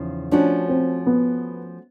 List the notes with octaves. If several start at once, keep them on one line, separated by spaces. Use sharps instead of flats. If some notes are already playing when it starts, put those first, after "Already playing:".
Already playing: E2 C#3 F3 D#4
F3 A3 C#4 D4 F#4
C4
B3